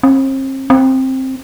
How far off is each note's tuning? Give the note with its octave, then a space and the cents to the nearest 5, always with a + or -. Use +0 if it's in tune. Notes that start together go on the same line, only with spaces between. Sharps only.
C4 +40
C4 +10